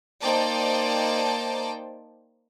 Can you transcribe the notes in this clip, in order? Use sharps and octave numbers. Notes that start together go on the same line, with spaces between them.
A#3 D#4 C5 D5 G5 A5